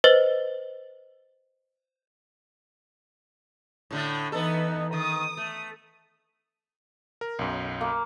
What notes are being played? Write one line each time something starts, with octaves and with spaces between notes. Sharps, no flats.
B4 C5 D#5 A6
A2 D3 A3
E3 B3 D#4 A4
D#3 D#6
A3
A#4
B1 F#2
A#3